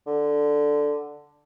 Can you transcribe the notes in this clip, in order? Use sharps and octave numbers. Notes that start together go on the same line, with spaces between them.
D3